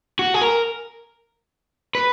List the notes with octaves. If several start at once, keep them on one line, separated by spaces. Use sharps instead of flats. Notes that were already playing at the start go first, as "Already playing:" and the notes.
F#4
G#4
A#4
B4